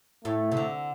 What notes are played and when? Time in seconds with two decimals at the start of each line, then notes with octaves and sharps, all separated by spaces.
0.25 A2 A3
0.52 C3
0.57 D3